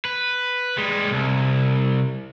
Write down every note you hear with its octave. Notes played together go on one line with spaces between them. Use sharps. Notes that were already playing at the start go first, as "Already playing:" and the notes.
B4
G3 G#3
C2